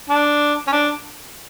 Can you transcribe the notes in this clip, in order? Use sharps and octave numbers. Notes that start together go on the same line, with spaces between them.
D4
C#4
D4